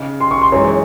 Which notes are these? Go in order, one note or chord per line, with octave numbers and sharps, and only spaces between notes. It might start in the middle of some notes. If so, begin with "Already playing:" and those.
Already playing: C#3 D#4
C6
C#6
C6
F#2 E3 G#3 D#4 C#5
C#5